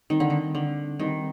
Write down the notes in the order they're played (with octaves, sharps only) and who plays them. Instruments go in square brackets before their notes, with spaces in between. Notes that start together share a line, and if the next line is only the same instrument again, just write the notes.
[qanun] D#3 [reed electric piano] G3 C4 D#4
[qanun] D3
D#3
D3
[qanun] D#3 [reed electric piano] G3 C4 D#4